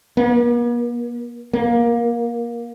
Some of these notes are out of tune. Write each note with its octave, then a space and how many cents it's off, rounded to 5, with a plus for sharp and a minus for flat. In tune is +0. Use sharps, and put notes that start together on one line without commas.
A#3 +45
A#3 +20